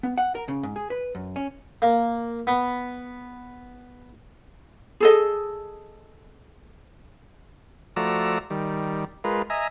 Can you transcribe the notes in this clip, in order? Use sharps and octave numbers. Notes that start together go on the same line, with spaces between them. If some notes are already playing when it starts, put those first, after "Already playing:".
B3
F#5
A#4
C#3
G#2
G#4
B4
F#2
C#4
A#3
B3
G#4 A4 D#5
F3 A3 F#4 D5 A#5 E6
D#3 G3
G#3 F4 A#4 B4
D#5 E5 G#5 A#5